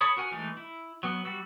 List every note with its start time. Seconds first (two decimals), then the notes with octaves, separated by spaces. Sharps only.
0.01 A4 C#5 B5 D#6
0.17 F#4 A#4 F#5 G#5
0.31 E3 G#3 A3 D#4
0.57 E4
1.03 F#3 B3
1.25 G3 F#4 E6